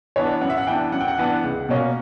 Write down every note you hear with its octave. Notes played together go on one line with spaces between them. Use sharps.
E3 B3 D4 C#5
F#2 F#5
E5
F#5
E3 B3 D4 G5
F#2 F#5
G5
F#5
E3 B3 D4
C#2
B2 A#3 C#4